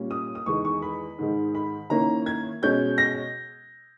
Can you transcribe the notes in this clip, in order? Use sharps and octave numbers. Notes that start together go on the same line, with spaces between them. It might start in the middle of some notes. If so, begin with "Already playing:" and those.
Already playing: A#2 G3 C#4
D#6
D#6
E2 D#3 G#3 C#6
C#6
B5
G#2 D#3 G#3
B5
D#3 A#3 C#4 E4 A#5
G#6
B2 G#3 C#4 G6
A#6